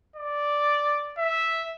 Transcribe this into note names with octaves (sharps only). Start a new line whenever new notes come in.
D5
E5